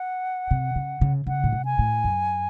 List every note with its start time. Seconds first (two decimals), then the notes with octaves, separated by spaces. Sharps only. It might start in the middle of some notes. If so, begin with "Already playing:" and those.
Already playing: F#5
0.51 C3
0.76 C#3
1.01 C#3
1.27 C#3 F#5
1.44 A2
1.53 C3
1.65 G#5
1.79 A2
2.04 F#2